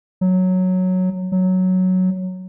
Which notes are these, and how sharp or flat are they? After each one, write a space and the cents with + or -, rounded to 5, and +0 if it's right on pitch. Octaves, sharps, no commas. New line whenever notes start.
F#3 -5
F#3 +0